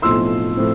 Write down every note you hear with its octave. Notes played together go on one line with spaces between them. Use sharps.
B1 A2 F3 C4 C6 E6
A2 F3 C4